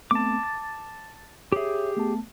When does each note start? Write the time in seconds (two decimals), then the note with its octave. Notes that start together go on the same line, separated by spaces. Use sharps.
0.11 A3 B3 C4 A5 D6
0.43 A6
1.52 G4 G#4 C#5 E5
1.97 A3 B3 A5